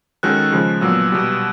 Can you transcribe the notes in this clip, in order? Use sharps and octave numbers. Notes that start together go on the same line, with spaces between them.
D#3 G#3 C#4 F#4 A4 F#6
C#3 F3 G#3
A#2 F#3 B3 E6
B2 G3 B3